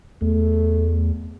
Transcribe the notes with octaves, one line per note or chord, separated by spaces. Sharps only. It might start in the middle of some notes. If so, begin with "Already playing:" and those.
E2 A3